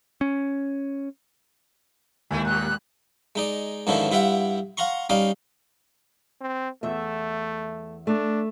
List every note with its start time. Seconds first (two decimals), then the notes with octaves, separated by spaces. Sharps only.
0.21 C#4
2.31 D#2 D#3 G#3 A3 E4
2.45 A2 G3 F#6
3.35 G#3 D#4 D5
3.87 G#2 D3 D#3 F3 C#4 E4
4.11 G2 E4 F4 E5 F#5 G5
4.77 F5 F#5 A#5 C6 C#6
5.10 G3 C#4 D#4 D5 F5 D6
6.41 C4
6.83 E2 A3 E5
8.07 A3 D4